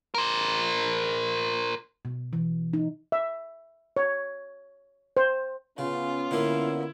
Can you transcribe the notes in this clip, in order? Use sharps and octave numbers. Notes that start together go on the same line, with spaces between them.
A#4 C5
B2
E3
D#4
E5
C#5
C5
C#3 B3 C#4 F4
D3 A#3 E4